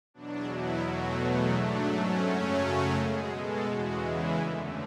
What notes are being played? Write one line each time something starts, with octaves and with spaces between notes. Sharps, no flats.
E2 B2 F#3 D4
E4
E2 B2 F#3 A3 F#4
G#2 F#3 A3 D4
C#4
F#2 C#3 F#3 A3
B2 G#3 G#4
A4
E2 C#3 E3 G#3 F#4
E4
F#2 D3 A3